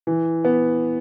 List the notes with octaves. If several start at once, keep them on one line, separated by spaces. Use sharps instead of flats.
E3
B3